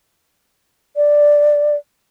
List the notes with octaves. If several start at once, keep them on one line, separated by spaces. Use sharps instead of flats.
D5